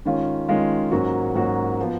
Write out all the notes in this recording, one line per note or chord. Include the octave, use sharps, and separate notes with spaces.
D#3 G#3 C#4 F4
D#3 G#3 C#4 F4
G#2 F#3 A#3 C#4 F#4
G#2 F#3 A#3 C#4 F#4
F3 B3